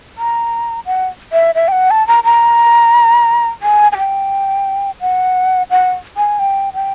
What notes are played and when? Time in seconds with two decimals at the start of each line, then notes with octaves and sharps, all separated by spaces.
0.18 A#5
0.86 F#5
1.33 E5
1.55 E5
1.68 G5
1.72 F#5
1.91 A5
2.08 A#5
2.24 A#5
3.63 G#5
3.92 G#5
3.98 G5
5.01 F#5
5.70 F#5
6.17 G#5
6.39 G5
6.74 G5